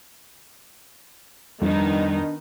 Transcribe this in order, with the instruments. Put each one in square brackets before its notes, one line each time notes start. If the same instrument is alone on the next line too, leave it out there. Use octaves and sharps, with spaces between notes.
[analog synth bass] F2 [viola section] D#3 B3 D#4 [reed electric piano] G3 [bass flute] D4